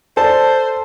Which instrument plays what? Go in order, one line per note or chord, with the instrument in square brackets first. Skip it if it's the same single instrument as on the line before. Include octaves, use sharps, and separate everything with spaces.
[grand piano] A4 [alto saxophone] C5 [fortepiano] D5 A5